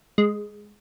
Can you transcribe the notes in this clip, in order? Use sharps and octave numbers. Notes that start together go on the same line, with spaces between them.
G#3